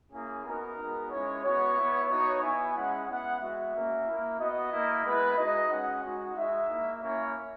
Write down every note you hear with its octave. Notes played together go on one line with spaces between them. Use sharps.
A#3 C#4 E4 G#4
B3 D#4 F#4 A#4
G#3 B3 D#4 F#4
G#3 C#4 E4 C#5
B3 F#4 C#5
B3 E4
B3 D#4 F#4 C#5
B3 E4 G#5
G#3 C#4 E4 F#5
B3 E4 F#5
G#3 B3 F#4 E5
A#3 C#4 F#4
A#3 E4
B3 F#4 D#5
A#3 E4
G#3 B3 E4 B4
G#3 D#4 F#4 D#5
G#3 C#4 F#4 F#5
G#3 D#4 F#4
G#3 D#4 F#4 E5
A#3 E4
A#3 C#4 E4 C#5